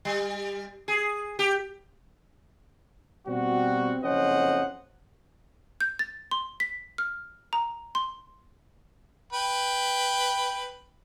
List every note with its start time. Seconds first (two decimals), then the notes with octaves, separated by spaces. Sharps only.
0.05 G3
0.88 G#4
1.39 G4
3.27 B2 G3 C4 F#4
4.04 F#1 F2 C#4 C5 D#5 F#5
5.81 G6
5.99 A6
6.31 C6
6.60 B6
6.98 F6
7.53 A#5
7.95 C6
9.33 B4 G5